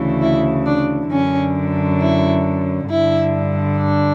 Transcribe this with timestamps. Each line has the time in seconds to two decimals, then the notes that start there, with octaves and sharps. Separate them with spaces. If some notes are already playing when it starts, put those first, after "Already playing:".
Already playing: D2 C#3 E3
0.21 E4
0.66 D4
1.11 F#2 D3 C#4
2.00 E4
2.89 G2 D3 E4
3.78 D4